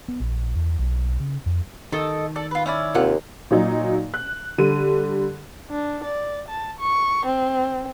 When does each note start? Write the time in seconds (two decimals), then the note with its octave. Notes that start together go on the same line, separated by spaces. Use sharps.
0.08 B3
0.20 A#1
0.55 E2
0.79 B1
1.20 C#3
1.46 F2
1.92 D#3 A4 D#5
2.36 A4 D5
2.51 F4 B4
2.66 C#4 E4 D5
2.95 D#2 C3 F4 F#5
3.51 A#2 F#3 D#4
4.14 F#6
4.58 D3 G3 D#7
5.70 D4
6.04 D5
6.48 A5
6.79 C#6
7.25 C4